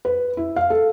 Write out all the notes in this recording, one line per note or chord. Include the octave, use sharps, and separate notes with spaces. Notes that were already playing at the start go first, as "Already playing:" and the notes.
B4
E4
F5
A4